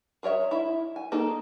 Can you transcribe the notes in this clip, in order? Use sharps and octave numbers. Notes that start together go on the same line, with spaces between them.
G#4 A#4 C#5 E5
E4 E5
G#5
A#3 D#4 G#4 A4